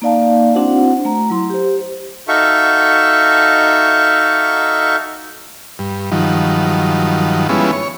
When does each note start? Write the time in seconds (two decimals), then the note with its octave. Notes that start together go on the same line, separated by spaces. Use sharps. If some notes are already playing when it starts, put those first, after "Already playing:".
0.02 A#3 D#4 D5 F5 A5
0.54 C4 D4 E4 F#4 C5 F#5
1.05 A3 A#5
1.30 F#3 E4 C6
1.50 G4 C5
2.28 D#4 F#4 A4 E5 F5 C#6
5.79 G2
6.11 G2 D#3 F3 F#3
7.49 F3 G3 G#3 B3 C#4 E4
7.73 C#5